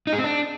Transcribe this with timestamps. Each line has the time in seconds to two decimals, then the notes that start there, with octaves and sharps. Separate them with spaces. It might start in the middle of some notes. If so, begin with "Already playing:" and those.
0.07 D#4
0.13 G#4
0.18 C4
0.24 D4